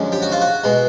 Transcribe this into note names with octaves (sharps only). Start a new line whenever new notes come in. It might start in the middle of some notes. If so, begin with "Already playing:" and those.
Already playing: F#2 D3 F3 G#3 C#4
G4
F#4
F4
F#4
B2 G#3